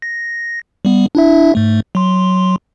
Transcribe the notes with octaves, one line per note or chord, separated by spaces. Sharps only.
A#6
G3 B3
D4 E4 E5
G#2 A3
F#3 C6